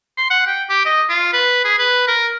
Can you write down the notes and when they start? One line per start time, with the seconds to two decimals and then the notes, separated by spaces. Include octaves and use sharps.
0.17 C6
0.30 F#5
0.47 G5
0.70 G4
0.85 D#5
1.09 F4
1.33 B4
1.64 G#4
1.79 B4
2.08 A#4